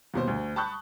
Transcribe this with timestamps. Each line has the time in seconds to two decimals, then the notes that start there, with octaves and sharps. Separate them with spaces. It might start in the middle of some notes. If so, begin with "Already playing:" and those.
0.14 D#2 B2 C5
0.27 D2
0.56 A5 B5 C#6 D#6 F#6 G6